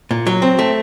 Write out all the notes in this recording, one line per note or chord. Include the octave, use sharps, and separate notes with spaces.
A#2
F#3
C4
A3